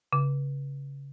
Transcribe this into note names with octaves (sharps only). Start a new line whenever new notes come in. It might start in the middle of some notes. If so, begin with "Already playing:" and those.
C#3